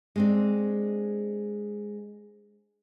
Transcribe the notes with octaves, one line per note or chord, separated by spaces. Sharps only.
G#3 C4 D4